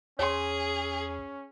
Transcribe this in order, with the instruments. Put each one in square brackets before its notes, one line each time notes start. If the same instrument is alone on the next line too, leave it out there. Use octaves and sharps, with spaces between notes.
[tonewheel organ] E2 [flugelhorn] C#4 [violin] G#4 [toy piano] C#5 C6